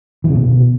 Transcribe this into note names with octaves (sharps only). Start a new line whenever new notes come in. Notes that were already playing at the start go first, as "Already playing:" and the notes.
E3
C#3
B2